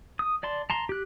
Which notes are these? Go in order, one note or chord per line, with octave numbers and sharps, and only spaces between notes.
D#6
D5 A5 C6
A5 A#5 C6
G4 F#6